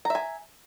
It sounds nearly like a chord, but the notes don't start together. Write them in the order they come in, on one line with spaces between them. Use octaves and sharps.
A#5 E5 G#5